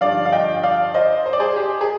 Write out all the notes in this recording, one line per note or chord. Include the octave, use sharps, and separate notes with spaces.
G2 D3 F3 D5 F5
F5
D#5 G5
D5 F5
C5 D#5
C5
D5
G#4 C5
G4
G#4